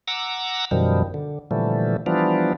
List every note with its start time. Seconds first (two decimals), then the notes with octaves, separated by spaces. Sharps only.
0.08 F#5 A#5 D6 E6
0.71 F#2 B2 D#3 F3 G3
1.14 D3
1.51 A#2 D3 E3 F3 G3 A3
2.06 E3 F3 G3 B3 D4 F4